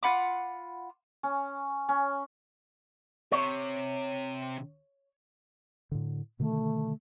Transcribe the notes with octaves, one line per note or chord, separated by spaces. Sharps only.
F4 F#5 B5 D6
C#4
C#4
C3 C#5
A2 D3
B2 D3 D#3 A3